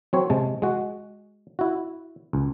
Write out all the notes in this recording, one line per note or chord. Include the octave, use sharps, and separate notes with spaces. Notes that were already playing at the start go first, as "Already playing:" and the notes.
F#3 C4 C#5
C3 G#3 A5
G#3 F#4
E4 F#4
C#2